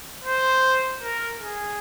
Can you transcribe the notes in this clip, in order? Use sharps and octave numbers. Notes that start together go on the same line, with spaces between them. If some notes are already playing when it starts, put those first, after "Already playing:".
C5
A#4
G#4